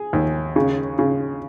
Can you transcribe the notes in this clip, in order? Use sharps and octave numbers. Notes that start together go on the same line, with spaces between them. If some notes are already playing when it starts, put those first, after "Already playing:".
Already playing: G#4
D#2
C#3
C#3